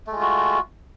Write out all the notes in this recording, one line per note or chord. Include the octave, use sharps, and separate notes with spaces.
G#3 A3 F4 F#4